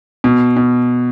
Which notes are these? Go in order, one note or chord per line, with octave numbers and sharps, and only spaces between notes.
B2
B2